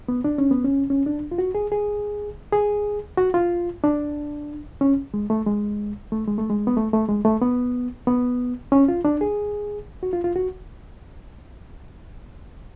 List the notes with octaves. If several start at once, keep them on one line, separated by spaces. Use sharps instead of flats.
B3
D4
C#4
B3
C#4
C#4
D4
F4
F#4
G#4
G#4
G#4
F#4
F4
D4
C#4
G#3
A3
G#3
A3
G#3
A3
G#3
B3
A3
A3
G#3
A3
B3
B3
C#4
F4
D4
G#4
F#4
F4
F4
F#4